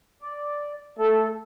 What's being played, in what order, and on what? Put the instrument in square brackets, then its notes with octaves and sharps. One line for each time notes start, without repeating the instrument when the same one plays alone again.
[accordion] D5
[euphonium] A3 [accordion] A4